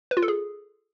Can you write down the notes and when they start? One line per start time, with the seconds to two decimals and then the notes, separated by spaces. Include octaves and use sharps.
0.11 B4
0.17 F4
0.22 A4
0.28 G#4